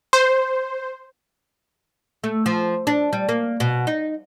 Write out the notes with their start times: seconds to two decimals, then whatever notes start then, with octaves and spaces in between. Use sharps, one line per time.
0.13 C5
2.24 A3
2.46 F3
2.87 D4
3.13 G3
3.29 A#3
3.60 B2
3.87 D#4